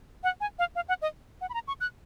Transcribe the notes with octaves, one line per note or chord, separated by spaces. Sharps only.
F#5
G#5
F5
F5
F#5
D#5
F#5
B5
A#5
C#6
F#6